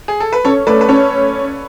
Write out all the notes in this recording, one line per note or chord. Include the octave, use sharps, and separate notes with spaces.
G#4
A4
B4
C#4 A4 C#5
A3 B4 D5
B4
C#4 A4 C#5